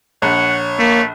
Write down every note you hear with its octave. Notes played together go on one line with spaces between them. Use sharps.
A#1 C#5 F#5
A3 A#3